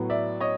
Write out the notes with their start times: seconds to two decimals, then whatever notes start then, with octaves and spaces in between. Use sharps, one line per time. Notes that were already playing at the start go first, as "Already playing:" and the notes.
Already playing: A2 F#3 B3
0.10 D5 E5
0.40 C#5 D#5